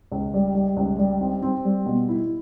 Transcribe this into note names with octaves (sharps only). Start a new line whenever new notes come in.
C#2
G3
G3
C#2
G3
C4
C4
G3
B2
E4